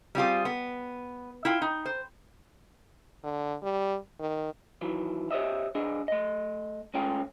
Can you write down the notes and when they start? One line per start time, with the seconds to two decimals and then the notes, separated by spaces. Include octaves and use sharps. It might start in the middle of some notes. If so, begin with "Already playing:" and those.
0.15 G3 C4 F4 G#4
0.45 B3
1.45 E4 F4 G5
1.62 D#4
1.85 C5
3.24 D3
3.63 G3
4.20 D#3
4.81 D#3 E3 F#3
5.31 G4 C5 C#5 D#5 E5
5.75 C2 D4 G#4 D#5
6.08 A3 D#5
6.94 G#3 A3 C#4 F4 G5